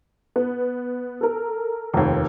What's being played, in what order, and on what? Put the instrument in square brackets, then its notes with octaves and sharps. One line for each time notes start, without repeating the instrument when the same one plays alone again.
[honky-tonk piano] B3
A4 A#4
[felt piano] F1 D#2